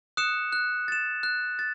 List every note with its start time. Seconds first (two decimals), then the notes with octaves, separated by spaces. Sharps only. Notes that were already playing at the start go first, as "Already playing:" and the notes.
0.17 D#6 F#6 C#7 E7
0.53 F#6
0.88 A6 E7
1.23 F#6
1.59 A6